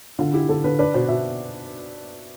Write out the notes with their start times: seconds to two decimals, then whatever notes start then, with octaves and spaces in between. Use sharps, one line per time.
0.19 D3 F4
0.34 E4 G4
0.49 D3 A4
0.64 D3 B4
0.79 D4 B4
0.94 B2 C5
1.09 B2 E5